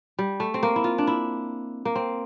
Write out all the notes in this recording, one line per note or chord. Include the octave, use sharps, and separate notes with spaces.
G3
A3
C4
A#3
E4
F4
D4
E4
A#3
C4